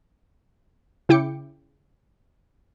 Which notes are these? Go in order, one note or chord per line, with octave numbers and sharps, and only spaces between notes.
C#3 E4 G5 D6 C#7